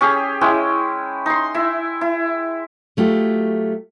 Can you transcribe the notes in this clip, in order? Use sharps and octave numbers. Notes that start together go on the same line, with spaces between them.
C#4 G4 G#4
G#3 C#4 E4 G5
D#4 C6
E4 E5
E4
F#3 A3 F4 G4